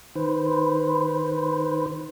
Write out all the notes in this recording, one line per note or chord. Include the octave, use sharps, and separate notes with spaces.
D#3 B4 C5